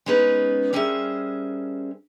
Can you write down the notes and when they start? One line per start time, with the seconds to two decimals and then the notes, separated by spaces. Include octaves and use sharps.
0.06 G#3 B3 C#4 D#4 B4
0.73 G3 C#4 G#4 A#4 C5 E5